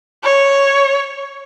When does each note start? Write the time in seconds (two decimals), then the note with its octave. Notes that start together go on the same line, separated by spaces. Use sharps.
0.24 C#5